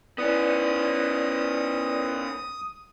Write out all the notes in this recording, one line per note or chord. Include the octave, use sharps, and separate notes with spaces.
B3 C#4 E4 B4 D5 D#6